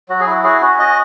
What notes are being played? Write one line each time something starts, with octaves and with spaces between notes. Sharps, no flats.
F#3 F#4
G#4
E4 F#4
F#4 G#4
C#4 F#4
F#4 D#5